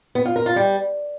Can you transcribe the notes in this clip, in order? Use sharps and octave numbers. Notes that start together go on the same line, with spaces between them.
B3
F4
A#4
F4
G3